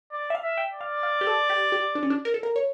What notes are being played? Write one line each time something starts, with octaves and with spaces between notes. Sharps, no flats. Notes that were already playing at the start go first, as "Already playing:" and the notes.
D5
E5
F5
E5
G5
D5
F5
F5
G4
A4
G4
G4
D4
C#4
D4
A#4
A4
A#4
C#5